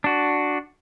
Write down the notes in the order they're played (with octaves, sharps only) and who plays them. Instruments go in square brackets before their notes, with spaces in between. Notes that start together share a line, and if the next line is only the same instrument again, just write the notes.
[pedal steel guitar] D4 F#4